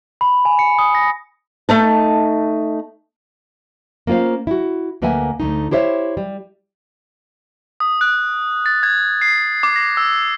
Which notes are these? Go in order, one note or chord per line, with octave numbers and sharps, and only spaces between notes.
B5
G#5
C#7
D#6
A#6
A3 D#4 A5
A#3 C#4 F4 C5 F5
E4 F#4
D2 A#3 B4 E5 F#5 G#5
D2 A3 D#4
E4 G4 C5 C#5 E5
G3
D#6
F#6
A6
G#6
C7
D6
A#6
E6